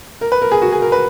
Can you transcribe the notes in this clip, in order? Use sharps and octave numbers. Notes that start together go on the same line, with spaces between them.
A#4
B4
A#4
G#4
F#4
G#4
A#4
B4